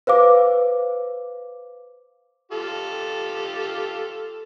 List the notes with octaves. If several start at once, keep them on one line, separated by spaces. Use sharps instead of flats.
B4 C5 F5 D6
F4 G4 A4